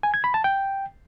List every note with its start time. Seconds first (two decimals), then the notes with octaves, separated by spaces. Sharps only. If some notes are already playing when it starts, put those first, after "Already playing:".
0.03 G#5
0.14 G#6
0.24 B5
0.34 A5
0.44 G5